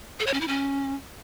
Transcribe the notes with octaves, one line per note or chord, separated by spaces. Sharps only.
A4
C#5
C#4
E4
C#4